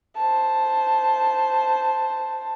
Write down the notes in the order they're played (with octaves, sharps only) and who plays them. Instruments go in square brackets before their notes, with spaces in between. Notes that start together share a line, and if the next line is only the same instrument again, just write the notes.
[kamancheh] C5 A5